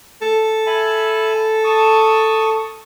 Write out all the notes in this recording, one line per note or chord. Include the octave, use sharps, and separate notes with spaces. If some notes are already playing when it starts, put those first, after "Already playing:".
A4
E5 G#5 B5
A5 C#6 D#6